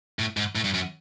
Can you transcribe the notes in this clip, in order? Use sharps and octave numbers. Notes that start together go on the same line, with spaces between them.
A2
G#2
A2
G2
F#2